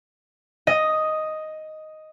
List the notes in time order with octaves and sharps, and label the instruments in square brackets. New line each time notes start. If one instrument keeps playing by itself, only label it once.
[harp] D#5